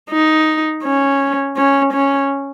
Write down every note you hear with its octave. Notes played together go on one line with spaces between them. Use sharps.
D#4
C#4
C#4
C#4